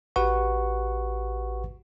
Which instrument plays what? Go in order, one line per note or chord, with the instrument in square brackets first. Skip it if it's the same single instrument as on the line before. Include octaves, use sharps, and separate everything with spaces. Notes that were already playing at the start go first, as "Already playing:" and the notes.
[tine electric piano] A1 F#4 G4 B4 F#5 C#6